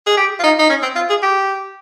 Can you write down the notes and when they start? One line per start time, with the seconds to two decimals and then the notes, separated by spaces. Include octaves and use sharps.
0.06 G#4
0.17 G4
0.39 F4
0.43 D#4
0.59 D#4
0.69 C#4
0.82 C4
0.95 F4
1.09 G#4
1.23 G4